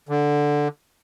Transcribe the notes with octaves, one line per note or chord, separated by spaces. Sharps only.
D3